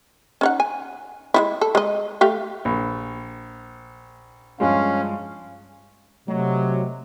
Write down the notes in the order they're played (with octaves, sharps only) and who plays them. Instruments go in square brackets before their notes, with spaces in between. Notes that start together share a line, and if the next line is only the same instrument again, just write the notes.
[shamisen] C#4 D#4 F#5
G#5
G#3 D#4 E4
A4
G#3 D#5
A3 G4 F5
[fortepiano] A#1
[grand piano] G2 F3 G#3 [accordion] C#4 [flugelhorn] F5
[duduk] C3 [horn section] F#3 [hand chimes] A3